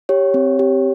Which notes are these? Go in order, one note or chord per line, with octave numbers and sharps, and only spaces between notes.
G4 C#5
C4
G4